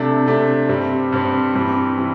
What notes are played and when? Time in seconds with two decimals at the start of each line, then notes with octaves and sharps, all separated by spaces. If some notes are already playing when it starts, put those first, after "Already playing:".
Already playing: C3 A3 D4
0.26 C3 A3 D4
0.69 G2 G3 C4
1.12 G2 G3 C4
1.55 G2 E3 G3 C4
1.98 E3 G3